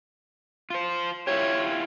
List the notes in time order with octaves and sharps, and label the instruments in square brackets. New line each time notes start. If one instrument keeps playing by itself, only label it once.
[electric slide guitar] F4 C5
[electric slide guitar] E4 F4 G4 [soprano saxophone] C#5